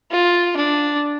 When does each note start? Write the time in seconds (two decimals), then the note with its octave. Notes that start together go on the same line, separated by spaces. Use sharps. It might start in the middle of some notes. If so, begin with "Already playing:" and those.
0.12 F4
0.57 D4